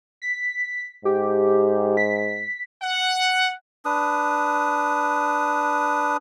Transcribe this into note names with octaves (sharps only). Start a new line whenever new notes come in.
B6
G#2 G4
B6
F#5
D4 B4 D#6